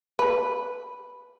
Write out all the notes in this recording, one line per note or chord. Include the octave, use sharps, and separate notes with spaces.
B4